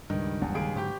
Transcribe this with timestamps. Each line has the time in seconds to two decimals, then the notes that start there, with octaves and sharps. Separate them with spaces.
0.10 C#2 G2 D#3
0.41 F#1 E2
0.55 D#2 D3 D#3 G#4 D7
0.76 G#1 G#2 D3 F#3 G4 G5